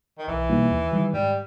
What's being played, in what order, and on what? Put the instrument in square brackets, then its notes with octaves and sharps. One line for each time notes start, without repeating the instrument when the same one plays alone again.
[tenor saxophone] D#3
[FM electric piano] B1 [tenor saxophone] E3
[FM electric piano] B2 G3 A#3 D#4
D#2
D#3 G3
[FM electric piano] G#2 [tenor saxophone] G3